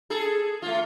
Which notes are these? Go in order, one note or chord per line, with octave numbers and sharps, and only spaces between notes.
G#4 A4
A3 F4